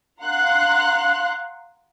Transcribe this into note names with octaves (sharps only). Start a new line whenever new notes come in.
F5 F#5 A#5 C6 F#6